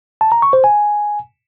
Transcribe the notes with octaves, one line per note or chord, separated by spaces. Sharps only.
A5
A#5
C#6
C5
G#5